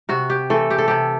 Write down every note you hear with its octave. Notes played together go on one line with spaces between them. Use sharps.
C3 F#4
G4
E3 A3 A4
G4
A4
C3 G4